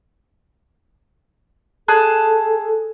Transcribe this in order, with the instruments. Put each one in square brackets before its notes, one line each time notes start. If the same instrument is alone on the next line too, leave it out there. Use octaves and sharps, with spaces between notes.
[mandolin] G#4 A5 F#6 [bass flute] A4